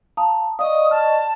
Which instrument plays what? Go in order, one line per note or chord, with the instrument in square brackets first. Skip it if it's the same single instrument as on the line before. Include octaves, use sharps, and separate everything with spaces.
[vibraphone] F5 [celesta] A5 A#5 D#6
[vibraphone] D5 D#5 C#6 [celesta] F5 [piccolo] D#6
[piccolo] A5 [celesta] F6